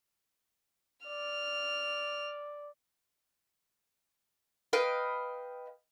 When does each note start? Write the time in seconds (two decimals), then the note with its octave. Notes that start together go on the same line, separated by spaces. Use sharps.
1.07 D5 F6
4.73 B4 D#5 F5 G5